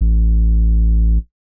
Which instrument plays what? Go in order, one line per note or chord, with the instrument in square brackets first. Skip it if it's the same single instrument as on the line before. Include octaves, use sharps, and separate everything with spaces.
[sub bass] A1